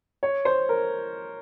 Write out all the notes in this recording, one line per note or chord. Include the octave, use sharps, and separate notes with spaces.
C#5
C5
A#4